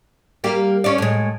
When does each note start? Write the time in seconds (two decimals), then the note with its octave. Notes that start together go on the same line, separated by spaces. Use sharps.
0.44 G3 A#3 G4
0.84 C#4 D5
0.98 A2 G#3